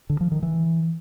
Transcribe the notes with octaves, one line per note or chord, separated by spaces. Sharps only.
D3
F3
D#3
E3